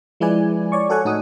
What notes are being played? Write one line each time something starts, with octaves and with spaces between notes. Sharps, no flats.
F3 G#3 E4 B4 D5 G#5
C#5 D5 C#6
F#4 A4 C#5 F#5 G#5
A2 D#4 F#4 D#6